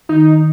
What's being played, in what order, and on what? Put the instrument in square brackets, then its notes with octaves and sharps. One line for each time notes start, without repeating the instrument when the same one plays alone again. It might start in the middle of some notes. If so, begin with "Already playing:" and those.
[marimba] D#3 [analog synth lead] D#4